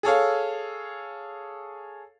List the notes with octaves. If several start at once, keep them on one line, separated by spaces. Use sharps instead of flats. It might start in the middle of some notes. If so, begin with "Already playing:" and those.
G#4 A4 C#5 F5